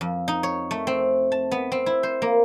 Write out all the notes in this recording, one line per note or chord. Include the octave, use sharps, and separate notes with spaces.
F2
D#4
C#5
A3
C4
A5
B3
C4
E4
C5
A#3